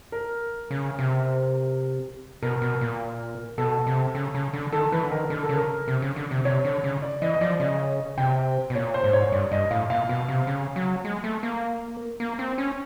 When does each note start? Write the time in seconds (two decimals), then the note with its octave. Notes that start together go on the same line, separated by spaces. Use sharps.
0.12 A#4
0.71 C#3
0.99 C3
2.43 B2 A#4
2.62 B2
2.81 A#2
3.58 B2 A4
3.86 C3
4.15 C#3
4.34 C#3
4.53 D3
4.72 D#3 A4
4.92 E3 B4
5.03 D3
5.11 D#3 A#4
5.30 D3 A#4
5.43 A4
5.49 C#3
5.56 A#4
5.88 C3
6.02 C#3
6.16 D3
6.31 C3
6.45 C3 C#5
6.65 D3
6.84 C#3
7.02 D5
7.22 E3 D#5
7.34 D#5
7.41 F3 D5
7.60 C#3 D#5
8.18 C3 G5
8.70 B2
8.75 A#2 C#5
8.94 C5
9.04 G#2
9.13 C#5
9.32 G2 D5
9.52 G2 D#5
9.71 A2 F5
9.90 A#2 F5
10.09 B2
10.28 C3
10.47 C#3
10.76 F#3
11.05 G#3
11.24 A3
11.43 A#3
12.20 A#3
12.39 C4
12.58 C#4